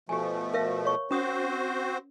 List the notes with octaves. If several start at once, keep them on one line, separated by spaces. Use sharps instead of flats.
B2 F3 A3 G4 G#5
A#4 E5 F5
C#5 C#6
C4 C#4 F#4 C5 D#6